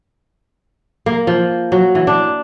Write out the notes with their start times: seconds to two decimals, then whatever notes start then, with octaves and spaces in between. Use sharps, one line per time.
1.06 A#3
1.27 F3
1.72 F#3
1.95 E3
2.07 D4